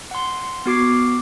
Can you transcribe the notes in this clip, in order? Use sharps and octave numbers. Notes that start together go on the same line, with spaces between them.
F#5 C6
B3 F#4 D6 C7